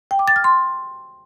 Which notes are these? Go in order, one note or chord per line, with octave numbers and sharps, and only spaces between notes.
G5
D6
A6
F6
C6